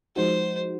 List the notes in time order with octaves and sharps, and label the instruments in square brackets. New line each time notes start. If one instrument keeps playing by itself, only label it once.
[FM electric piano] F3 G#3 D#4 F#4 [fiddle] C5